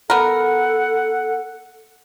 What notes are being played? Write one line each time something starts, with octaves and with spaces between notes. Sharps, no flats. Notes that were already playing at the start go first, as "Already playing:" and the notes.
B3 A4 A#4 F#5